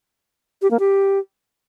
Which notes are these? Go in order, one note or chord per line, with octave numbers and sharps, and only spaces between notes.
G4
A#3
G4